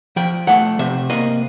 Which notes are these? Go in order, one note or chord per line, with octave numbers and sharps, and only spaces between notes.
F3 G5
A3 F#5
C3 E5
A#3 D#5